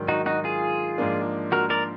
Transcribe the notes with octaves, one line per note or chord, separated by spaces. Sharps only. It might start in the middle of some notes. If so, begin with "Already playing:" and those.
Already playing: G#2 D#3 F#3 D4
D#4 F#4
D#4 F#4
F4 G#4
G#2 F3 A#3 D4
F#4 A#4
A#4 D5